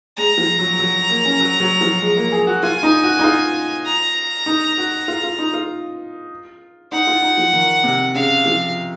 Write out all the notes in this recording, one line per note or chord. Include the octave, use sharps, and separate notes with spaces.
G#3 A#5
F3
F#3
F#3
A#3
C#4
F#3
F#3
F3
G#3
A#3
G#4
F#4
F4 G#5
D#4
F#4
D#4
F4
A#5
D#4
F#4
F4
F4
D#4
F4
D#4 F#5
F4
D#4
F3
D#3
C3
C#3 F5
F3